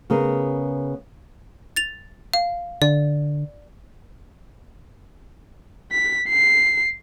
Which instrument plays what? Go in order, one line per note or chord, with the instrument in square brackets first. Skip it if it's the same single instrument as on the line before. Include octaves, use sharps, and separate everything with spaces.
[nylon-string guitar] C#3 B3 G#4 A#4
[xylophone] A6 F7
F5
[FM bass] D3 [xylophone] D5
[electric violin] B6
C7